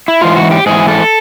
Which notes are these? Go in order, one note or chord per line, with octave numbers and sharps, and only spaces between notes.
E4
G#2 E3 F4
F#4
G4
G#2 E3 G#4
A4